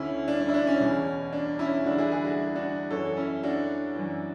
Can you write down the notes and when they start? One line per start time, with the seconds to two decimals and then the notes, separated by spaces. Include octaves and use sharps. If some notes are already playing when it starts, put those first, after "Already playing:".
Already playing: D2 D3 C#4 E4
0.28 D4
0.40 D4
0.48 E4
0.54 D4
0.67 C#4
0.80 E2 B2
1.33 D4
1.59 C#4 E4
1.85 E2 D3 D4 F#4
1.98 E4 G#4
2.12 E4 G#4
2.25 D4 F#4
2.55 D4 F#4
2.90 F#2 E3 A4 C#5
3.17 C#4 E4
3.43 D4 F#4
3.95 F#2 E3